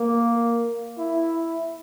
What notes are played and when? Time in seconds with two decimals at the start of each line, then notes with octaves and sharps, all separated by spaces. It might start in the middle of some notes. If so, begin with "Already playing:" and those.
Already playing: A#3
0.98 E4